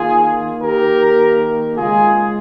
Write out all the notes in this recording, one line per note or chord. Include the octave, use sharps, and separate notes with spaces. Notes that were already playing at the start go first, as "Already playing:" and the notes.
Already playing: D#3 A#3 F4 G#4
G4 A#4
C#3 G#3 F4 G#4